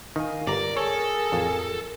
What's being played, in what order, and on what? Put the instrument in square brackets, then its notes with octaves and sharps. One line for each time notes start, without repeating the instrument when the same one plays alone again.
[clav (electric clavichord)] D#3 [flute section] A#4 F5 G#5
[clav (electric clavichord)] G1 A#5 [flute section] A#4 [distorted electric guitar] D5
[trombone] G#4 [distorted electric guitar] A4 [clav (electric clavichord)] C#5
[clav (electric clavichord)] A1 F2